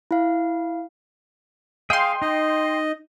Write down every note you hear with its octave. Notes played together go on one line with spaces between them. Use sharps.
E4 F5
G#4 D#5 F5 G5 C6
D#4 D#5